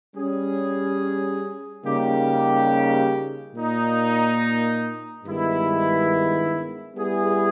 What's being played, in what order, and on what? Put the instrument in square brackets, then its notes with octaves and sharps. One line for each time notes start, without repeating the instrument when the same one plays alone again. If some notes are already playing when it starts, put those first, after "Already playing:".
[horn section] G3 C#4 G#4
C#3 G3 A#3 D#4 G4
A#2 A#3 D#4
G2 D#3 G#3 B3 E4
G3 B3 E4 G#4